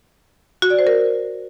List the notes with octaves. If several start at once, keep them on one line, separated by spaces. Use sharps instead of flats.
F#4
D5
C5
A#4